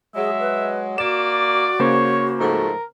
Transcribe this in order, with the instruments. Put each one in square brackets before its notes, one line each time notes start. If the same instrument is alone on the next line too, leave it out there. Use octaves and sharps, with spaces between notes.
[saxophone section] F#3 G#3 [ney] G#4 [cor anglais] E5
[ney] B4
[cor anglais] A#3 [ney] F#4 [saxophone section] D5 [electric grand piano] E7
[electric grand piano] C#3 A#3 C5 [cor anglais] C#5
[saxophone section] G#2 F3 A3 [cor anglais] A#4